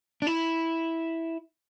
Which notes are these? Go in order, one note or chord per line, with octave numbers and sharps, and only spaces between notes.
D4
E4